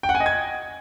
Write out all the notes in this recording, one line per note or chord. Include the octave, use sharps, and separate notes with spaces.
G5
F#5
G#5
D#5
G#6